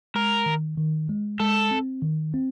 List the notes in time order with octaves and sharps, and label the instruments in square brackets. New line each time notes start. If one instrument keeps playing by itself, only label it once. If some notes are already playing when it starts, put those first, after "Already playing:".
[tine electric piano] G#3 [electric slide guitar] A#4
[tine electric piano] D#3
D#3
G#3
[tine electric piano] G#3 [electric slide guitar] A4
[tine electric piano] C4
D#3
C4